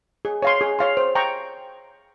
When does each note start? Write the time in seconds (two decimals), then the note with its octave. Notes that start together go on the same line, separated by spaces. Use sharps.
0.25 G#4
0.42 C#5 F5 C6
0.61 G#4
0.79 C#5 F5 C6
0.97 C5
1.15 G5 A#5 C#6